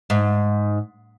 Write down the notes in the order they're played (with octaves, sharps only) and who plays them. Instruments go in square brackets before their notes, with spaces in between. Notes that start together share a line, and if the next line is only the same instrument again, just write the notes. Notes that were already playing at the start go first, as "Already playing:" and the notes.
[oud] G#2